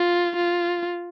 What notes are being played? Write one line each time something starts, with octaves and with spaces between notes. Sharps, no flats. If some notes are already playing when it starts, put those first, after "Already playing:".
Already playing: F4
F4